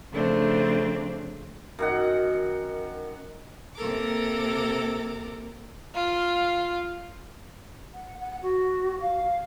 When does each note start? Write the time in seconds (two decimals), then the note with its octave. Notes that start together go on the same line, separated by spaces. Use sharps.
0.13 C#3 F3 A3 C4 D4
1.79 F#2 D#3 F#5
3.76 C3 A#3 A4 A#4 D6
5.95 F4 F5
7.94 F#5
8.20 F#5
8.42 F#4
9.00 F5